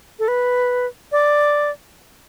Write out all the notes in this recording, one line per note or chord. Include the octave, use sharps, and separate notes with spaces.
A4
B4
D5